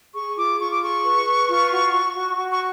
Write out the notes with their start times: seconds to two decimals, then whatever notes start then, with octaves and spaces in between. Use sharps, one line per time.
0.14 G#4 C#6
0.37 F4 D6
0.59 F4 C#6
0.71 D6
0.81 G#4 C#6
1.04 B4
1.26 B4
1.48 F4
1.71 F#4
1.93 F#4
2.15 F#4
2.37 F#4
2.53 C#6